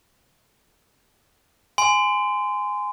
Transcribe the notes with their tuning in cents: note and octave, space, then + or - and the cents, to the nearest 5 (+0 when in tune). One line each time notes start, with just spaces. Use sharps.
G#5 +0 C6 -25